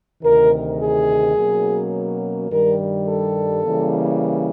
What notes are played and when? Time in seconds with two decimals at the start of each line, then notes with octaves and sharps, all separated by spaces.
0.22 D2 C3 D#3 A#4
0.80 G#4
1.36 B2 F#3 A#3 C#4
2.50 G2 D#3 G3 A#4
3.06 A4
3.63 C#3 E3 G3 A#3